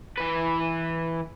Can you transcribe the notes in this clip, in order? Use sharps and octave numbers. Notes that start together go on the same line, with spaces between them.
E3 B4